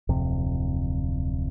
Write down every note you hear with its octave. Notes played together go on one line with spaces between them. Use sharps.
D1 F2 C3